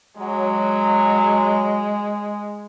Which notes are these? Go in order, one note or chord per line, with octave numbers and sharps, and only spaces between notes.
F#3 G#3